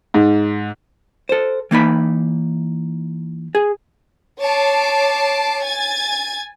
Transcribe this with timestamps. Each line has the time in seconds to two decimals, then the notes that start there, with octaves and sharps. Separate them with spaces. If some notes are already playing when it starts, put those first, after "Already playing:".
0.14 G#2
1.29 A4 C5
1.71 E3 A#3 D#4 B5
3.55 G#4
4.40 C#5 A5 D6 C7
5.63 G#5 G#6 A6